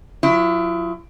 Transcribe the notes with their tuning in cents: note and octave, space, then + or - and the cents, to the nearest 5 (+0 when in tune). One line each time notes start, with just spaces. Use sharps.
F#3 -35 E4 +35